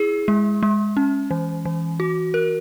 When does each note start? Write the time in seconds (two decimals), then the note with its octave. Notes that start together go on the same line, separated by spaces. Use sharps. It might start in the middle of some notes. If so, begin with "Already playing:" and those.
Already playing: E4 G#4
0.28 G#3
0.63 G#3
0.97 C#4
1.31 E3
1.65 E3
2.00 F#4
2.34 A#4